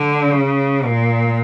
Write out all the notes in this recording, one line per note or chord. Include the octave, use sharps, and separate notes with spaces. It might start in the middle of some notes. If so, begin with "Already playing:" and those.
Already playing: D3
C#3
A#2